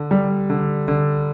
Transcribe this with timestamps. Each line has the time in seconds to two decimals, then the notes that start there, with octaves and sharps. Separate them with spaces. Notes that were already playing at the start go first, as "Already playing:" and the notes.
Already playing: D3
0.11 G3
0.50 D3
0.88 D3